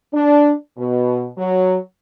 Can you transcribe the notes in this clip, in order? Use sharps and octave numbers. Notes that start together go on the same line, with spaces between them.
D4
B2
F#3